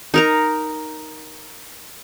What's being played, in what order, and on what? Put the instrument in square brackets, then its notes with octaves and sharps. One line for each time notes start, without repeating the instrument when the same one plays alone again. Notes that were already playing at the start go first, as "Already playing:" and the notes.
[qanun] D#4 A#4 A#5